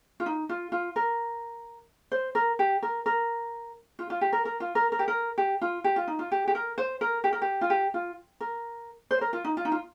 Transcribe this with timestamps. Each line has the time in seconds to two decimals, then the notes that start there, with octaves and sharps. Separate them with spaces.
0.20 F4
0.26 D#4
0.49 F4
0.72 F4
0.96 A#4
2.12 C5
2.35 A#4
2.59 G4
2.83 A#4
3.06 A#4
3.99 F4
4.10 F4
4.21 G4
4.33 A#4
4.45 A#4
4.60 F4
4.75 A#4
4.92 A#4
4.99 G4
5.08 A#4
5.38 G4
5.62 F4
5.84 G4
5.96 F4
6.07 D#4
6.19 F4
6.32 G4
6.48 G4
6.55 A#4
6.78 C5
7.01 A#4
7.24 G4
7.33 A#4
7.42 G4
7.61 F4
7.70 G4
7.94 F4
8.41 A#4
9.11 C5
9.21 A#4
9.33 F4
9.44 D#4
9.57 F4
9.65 D#4
9.72 F4